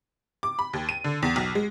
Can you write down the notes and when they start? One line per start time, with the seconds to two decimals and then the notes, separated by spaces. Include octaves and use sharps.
0.43 D6
0.59 B5
0.73 D#2
0.89 D#7
1.04 D3
1.22 E2
1.36 B1
1.55 G#3